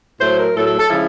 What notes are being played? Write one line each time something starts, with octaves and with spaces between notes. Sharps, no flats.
A2 F#3 A3 C5
A#4
A2 F#3 A3 A4
A4
A4
C#3 F3 G#3 E4